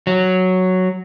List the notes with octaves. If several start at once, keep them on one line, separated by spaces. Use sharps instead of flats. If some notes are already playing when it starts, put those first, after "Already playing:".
F#3